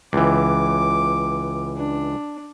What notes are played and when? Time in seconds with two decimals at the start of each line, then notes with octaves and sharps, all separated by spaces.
0.13 C#2 E3 D6
1.77 D4